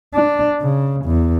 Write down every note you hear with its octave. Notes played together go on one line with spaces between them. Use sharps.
D4
C#3
E2